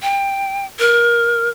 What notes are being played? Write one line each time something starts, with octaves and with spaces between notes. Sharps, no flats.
G5
A#4